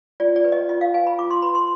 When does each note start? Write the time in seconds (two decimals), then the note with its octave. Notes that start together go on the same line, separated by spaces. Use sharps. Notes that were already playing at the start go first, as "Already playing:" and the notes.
0.20 F4 D5
0.36 D5
0.45 B4
0.52 D#5
0.69 F4 D#5
0.81 F5
0.94 B4 G#5
1.07 B5
1.19 F4 D6
1.30 C6
1.42 B4 B5
1.55 C6